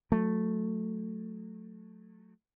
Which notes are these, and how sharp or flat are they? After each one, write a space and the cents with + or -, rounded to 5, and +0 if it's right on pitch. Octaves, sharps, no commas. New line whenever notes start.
F#3 -25 A3 +0